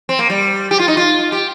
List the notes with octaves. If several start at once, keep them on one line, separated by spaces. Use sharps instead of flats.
C4
A#3
G3
G4
F4
D#4
F4
G4